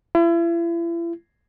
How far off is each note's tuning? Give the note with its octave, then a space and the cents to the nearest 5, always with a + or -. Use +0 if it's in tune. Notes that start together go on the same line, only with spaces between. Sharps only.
E4 +40